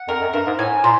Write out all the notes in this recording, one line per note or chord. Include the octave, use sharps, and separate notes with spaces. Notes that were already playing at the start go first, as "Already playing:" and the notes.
Already playing: F#5
F2 A#4
F#2
G2 A#4
G#2
A2 G#5
A#2 C5